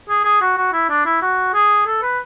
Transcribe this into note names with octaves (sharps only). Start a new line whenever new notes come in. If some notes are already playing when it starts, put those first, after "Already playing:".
G#4
G#4
F#4
F#4
E4
D4
E4
F#4
G#4
A4
B4